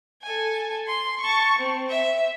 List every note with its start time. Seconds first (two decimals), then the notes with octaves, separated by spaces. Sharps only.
0.22 A4 G#5
0.87 C6
1.20 A5 C#6
1.57 C4
1.89 E5